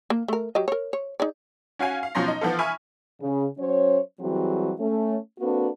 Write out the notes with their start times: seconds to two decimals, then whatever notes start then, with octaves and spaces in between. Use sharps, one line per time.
0.10 A#3
0.28 A3 A#4
0.55 F#3 G4 D#5
0.68 A#4 C#5
0.93 C#5
1.20 D#4 G#4 D5
1.79 C#4 F#4 F5 G#5
2.03 F5
2.15 B2 F3 F#3 C#4 C6 A#6
2.28 D#4
2.41 E3 F3 B3 F4 A4
2.59 E5 G#5 B5 C#6 F6
3.20 C#3
3.58 F#3 C#4 C5 C#5
4.20 E3 F#3 G3 C4 F#4 G#4
4.79 A3 C#4
5.40 A#3 C4 D4 F#4 A4 B4